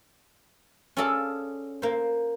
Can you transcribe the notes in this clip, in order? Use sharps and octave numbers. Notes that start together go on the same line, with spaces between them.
C#4 F4 G#4 A4 D5 A5
A#3 C5